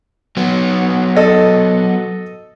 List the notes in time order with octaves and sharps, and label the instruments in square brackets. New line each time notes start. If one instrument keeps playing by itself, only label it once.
[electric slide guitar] F#3 B3
[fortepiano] A4 D#5